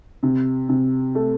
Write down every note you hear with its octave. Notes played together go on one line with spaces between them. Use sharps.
C3
C3
A3